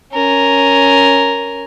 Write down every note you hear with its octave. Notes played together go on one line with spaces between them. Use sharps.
C#4 A#4